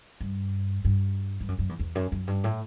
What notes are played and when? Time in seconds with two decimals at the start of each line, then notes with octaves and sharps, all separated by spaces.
0.21 G2
0.85 G2
1.40 G2
1.48 F#2
1.59 F#2
1.69 E2
1.79 E2
1.95 F#2
2.12 F#2
2.27 G2
2.44 A2